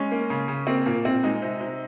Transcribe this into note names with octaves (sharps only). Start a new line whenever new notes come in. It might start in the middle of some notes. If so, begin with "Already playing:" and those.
Already playing: G#3 C#4
A#3
C#3
C#3
A#3 C4
A#2 A#3
A#2 C4
G#3 D#4
C3
C3